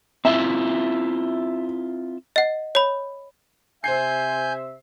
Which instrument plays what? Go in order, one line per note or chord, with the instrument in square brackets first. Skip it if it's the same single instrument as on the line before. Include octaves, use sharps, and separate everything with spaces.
[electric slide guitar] C4 E4 F4 [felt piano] E5
[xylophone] D#5 F#5
C#5 B5
[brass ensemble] C3 E5 [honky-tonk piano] C5 C7 [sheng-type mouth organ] G#5 G6